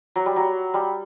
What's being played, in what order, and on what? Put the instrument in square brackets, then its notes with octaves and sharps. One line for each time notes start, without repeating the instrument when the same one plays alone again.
[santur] F#3
G3
F#3
G3